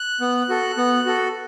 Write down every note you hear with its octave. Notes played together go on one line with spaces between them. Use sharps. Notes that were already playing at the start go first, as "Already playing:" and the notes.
Already playing: F#6
B3
F#4 A4
B3
F#4 A4